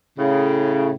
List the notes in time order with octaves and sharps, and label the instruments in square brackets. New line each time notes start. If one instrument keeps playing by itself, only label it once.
[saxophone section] A2 C#3